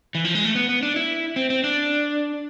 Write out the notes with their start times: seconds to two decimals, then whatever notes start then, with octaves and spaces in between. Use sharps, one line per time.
0.15 E3
0.25 F3
0.35 G#3
0.45 A3
0.55 B3
0.69 B3
0.83 D4
0.96 E4
1.36 C4
1.50 C4
1.64 D4